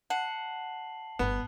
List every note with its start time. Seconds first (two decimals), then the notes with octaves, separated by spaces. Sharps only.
0.10 F#5 A5 C7 F#7
1.19 G1 B3